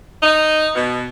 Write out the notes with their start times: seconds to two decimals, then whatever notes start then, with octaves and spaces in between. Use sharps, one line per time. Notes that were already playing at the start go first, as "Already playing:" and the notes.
0.23 D#4
0.76 B2